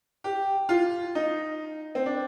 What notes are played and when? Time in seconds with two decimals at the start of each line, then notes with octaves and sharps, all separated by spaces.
0.24 G4
0.69 F4
1.15 D#4
1.95 C4
2.06 D4